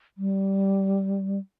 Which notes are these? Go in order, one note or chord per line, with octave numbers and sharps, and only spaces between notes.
G3